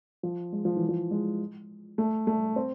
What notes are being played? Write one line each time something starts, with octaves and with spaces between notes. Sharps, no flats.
F3
G#3
F3
E3
F3
G#3
A3
A3
C4